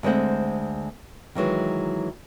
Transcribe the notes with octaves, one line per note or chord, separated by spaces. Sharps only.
D2 G#3 C4 C5 F#5
D#3 E3 F#3 G#3